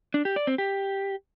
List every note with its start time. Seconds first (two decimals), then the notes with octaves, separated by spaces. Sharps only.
0.14 D4
0.25 G4
0.36 D5
0.47 C4
0.58 G4